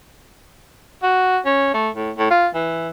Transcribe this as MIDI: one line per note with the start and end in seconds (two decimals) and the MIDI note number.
1.03 1.39 66
1.46 1.72 61
1.74 1.89 57
1.95 2.11 45
2.18 2.30 45
2.30 2.48 65
2.54 2.89 52